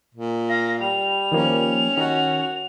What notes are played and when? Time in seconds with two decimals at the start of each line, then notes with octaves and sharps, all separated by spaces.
0.15 A#2
0.49 F5 A#6
0.81 G3 F7
1.32 D#3 F3 A#3 C#4
1.97 D#3 F#4